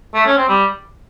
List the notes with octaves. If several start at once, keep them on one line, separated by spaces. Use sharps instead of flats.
A3
C#4
C4
G3